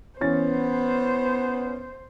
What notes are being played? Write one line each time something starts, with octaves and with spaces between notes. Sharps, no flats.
E3 B3 C#4 C5 A6